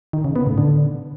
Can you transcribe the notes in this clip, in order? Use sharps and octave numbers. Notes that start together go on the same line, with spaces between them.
D#3
C#3
B3
A2
D3